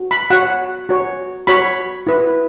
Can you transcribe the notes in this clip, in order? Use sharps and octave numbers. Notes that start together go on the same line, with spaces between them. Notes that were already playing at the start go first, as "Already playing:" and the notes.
Already playing: F#4
B5
F#4 C#5 F#5
F#4 C#5
F#4 C#5 B5
E4 B4